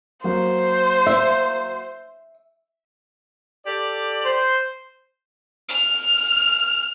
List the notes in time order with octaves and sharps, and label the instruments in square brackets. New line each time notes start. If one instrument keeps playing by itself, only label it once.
[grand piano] F#3 A#3 [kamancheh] C5
[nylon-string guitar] E5
[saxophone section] G4 A4 D5
[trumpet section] C5
[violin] F6